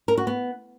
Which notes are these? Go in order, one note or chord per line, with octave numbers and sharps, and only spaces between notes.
A#4
F#4
B3